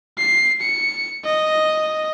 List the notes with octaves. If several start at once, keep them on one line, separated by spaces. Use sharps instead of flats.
C7
C#7
D#5